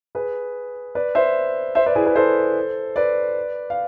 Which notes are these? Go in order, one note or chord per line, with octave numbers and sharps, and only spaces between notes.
G#4 B4
B4 D5
C5 E5
C5 E5
B4 D5
E4 G#4
G#4 B4
A4 C5
B4 D5
F5